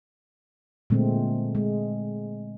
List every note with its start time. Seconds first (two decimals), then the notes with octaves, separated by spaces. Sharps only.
0.90 A#2 D3 G#3 A3 C4
1.55 G#3